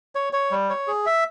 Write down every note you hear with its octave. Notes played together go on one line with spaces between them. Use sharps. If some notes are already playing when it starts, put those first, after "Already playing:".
C#5
C#5
G3
C#5
G#4
E5